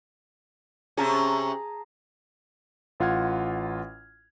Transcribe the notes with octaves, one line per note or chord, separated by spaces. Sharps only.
C3 C#4 G#4 A5 A#5
A1 F4 F#5 F6 G#6